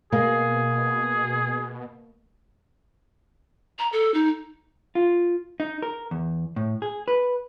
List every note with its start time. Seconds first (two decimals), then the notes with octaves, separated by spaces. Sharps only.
0.12 B2 A#3 G#4
3.79 A#5
3.93 A4
4.14 D#4
4.95 F4
5.60 D#4
5.82 A#4
6.11 E2
6.56 A2
6.82 G#4
7.08 B4